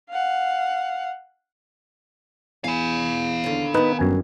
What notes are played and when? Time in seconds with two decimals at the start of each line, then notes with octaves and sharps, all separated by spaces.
0.10 F5 F#5
2.64 E2 F5 G#5 B5
3.44 D#2 D3
3.74 D#3 B3 D#4 B4
3.99 G1 F#2 G#5